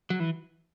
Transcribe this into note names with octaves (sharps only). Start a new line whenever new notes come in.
F#3
E3